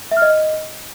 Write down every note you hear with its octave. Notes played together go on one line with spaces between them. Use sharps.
E5
F6
D#5